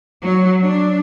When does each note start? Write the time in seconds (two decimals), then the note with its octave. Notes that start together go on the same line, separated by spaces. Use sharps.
0.23 F#3
0.63 D4